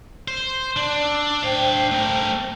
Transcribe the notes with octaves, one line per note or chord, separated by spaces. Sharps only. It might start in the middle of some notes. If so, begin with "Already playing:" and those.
C5
D4 D5
D6 E6
D4 C5 F5 G5
A3 A#4